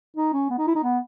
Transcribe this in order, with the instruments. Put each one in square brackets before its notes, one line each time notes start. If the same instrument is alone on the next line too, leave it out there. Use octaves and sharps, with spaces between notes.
[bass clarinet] D#4
C#4
B3
D#4
E4
D#4
B3